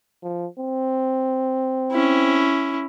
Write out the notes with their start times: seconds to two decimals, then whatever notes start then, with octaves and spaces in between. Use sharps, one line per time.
0.23 F3
0.59 C4
1.92 C#4 E4